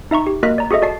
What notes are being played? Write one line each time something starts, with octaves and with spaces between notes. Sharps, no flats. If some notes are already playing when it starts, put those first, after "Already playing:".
D#4 E5 A#5 C#6
G4
A#3 F#4 A#4 D#5 F#6 B6
D5 A#5
F#4 G#4 A4 D#5 E5
F#4 D5 A5 C7